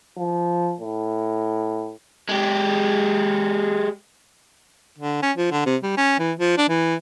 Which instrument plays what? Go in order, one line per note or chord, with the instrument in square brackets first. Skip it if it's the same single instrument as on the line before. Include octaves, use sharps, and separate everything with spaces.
[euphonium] F3
A2
[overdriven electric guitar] G#3 G4
[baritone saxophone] D3
C#4
F3
D3
C3
G3
C#4
E3
F3
D4
E3